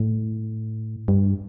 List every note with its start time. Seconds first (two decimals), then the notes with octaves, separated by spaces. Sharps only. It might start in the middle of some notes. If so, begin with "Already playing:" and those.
Already playing: A2
1.08 G2